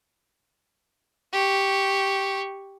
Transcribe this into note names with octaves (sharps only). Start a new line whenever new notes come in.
G4 C#6